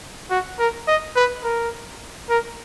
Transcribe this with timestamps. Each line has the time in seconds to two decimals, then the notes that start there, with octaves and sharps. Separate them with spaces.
0.31 F#4
0.59 A#4
0.88 D#5
1.16 B4
1.44 A#4
2.30 A#4